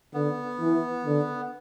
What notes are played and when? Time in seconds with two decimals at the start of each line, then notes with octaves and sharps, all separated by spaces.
0.14 D3 B3
0.60 E3
1.06 D3